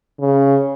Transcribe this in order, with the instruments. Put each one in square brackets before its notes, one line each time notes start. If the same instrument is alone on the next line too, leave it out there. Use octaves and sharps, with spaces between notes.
[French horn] C#3